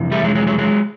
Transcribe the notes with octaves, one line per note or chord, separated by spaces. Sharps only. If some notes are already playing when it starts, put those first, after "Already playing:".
Already playing: F2 C3 E3
G3 A3
F#3 G#3
F#3 G#3
F#3 G#3
F#3 G#3